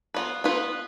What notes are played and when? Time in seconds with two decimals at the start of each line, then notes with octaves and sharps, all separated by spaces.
0.14 B3 F4 B4
0.44 B3 F4 B4